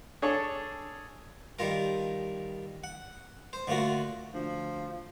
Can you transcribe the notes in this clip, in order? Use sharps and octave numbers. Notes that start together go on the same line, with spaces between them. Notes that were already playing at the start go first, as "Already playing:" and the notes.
D4 G#4 A4 C#5
D#3 G3 F4 A#4
F#5
C5
D3 A3 A#3 F4 F#4
D2 F3